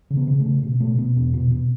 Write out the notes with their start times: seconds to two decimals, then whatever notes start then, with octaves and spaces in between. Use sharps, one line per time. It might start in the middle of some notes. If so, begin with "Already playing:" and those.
0.10 C#3
0.17 B3
0.27 C#3
0.40 A3
0.46 C#3
0.63 B2
0.80 B2 A3
0.98 B2 B3
1.16 E2 B3
1.34 B2
1.51 B2 B3